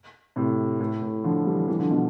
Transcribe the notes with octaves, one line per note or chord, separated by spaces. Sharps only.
A2 C3
A2
A2
D3 F3
E3 G3
E3 G3
D3 F3
B2 D3